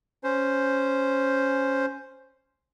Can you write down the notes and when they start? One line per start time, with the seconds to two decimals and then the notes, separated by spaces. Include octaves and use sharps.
0.24 C#4 C5